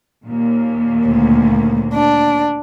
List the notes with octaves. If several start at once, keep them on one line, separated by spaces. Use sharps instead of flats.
D#2 A#2 A#3
D2
D4